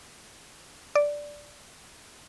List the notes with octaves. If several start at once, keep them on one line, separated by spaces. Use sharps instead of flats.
D5